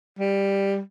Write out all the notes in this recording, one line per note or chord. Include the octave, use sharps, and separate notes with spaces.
G3